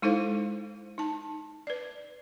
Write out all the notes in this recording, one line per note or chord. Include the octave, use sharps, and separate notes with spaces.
G#3 D#4 E4 A4 C5 F5
D#4 A5
B4 D5